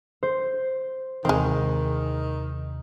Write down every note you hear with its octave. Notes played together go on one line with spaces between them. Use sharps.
C5
D#2 C3 D#3 E3 G#3 C4